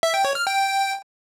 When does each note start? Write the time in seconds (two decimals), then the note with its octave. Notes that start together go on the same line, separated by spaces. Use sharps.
0.03 E5
0.14 G5
0.25 C#5
0.35 F6
0.46 G5